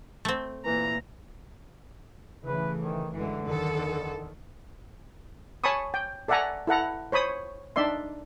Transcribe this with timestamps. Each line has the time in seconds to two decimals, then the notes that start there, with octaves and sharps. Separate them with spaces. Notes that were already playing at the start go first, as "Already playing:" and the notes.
0.25 A3 C4
0.66 A#2 E3 A#5
2.45 C#3 E3 A3 B4
2.81 D#3
3.13 F#2 D3 E3 G#3
3.45 E2 D#3 A4
5.64 C#5 G#5 A5 B5 C#6 D#6
5.94 G5
6.28 A4 D5 E5 F#5 G#5 A#5
6.67 E4 A4 F#5 A#5
7.12 C5 C#5 B5 D#6
7.76 D4 D#4 D5 E5 C6